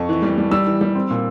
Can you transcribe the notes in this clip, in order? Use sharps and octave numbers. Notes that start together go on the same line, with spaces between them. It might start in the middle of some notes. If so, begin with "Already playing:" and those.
Already playing: F2 C#6
E3
G3
G3
G3 E6
E3
G3
C4
A#2